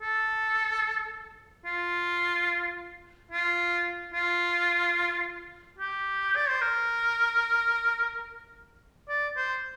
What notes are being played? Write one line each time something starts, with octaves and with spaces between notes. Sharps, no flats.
A4
F4
F4
F4
G4
D5
C5
A#4
D5
C5